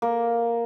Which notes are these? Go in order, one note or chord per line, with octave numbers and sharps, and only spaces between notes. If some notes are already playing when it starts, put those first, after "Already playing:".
A#3